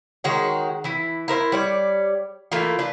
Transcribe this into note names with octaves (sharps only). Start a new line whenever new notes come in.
D#3 G#3 F#4 C#5
E3 E4
E4 A#4 C5
G3 C#5 D5
E3 A3 A#3 F4
D4 B4